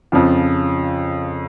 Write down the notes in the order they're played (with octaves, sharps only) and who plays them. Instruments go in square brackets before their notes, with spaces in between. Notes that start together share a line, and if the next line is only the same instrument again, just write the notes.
[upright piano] F2 C#3 F3